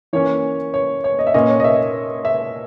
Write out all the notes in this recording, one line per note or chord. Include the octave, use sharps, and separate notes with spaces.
E3 A#3 C#4 C#5
C#5
C#5
D#5
E5
A#2 A#3 C#4 D#5
C#5
D#5
E5
E5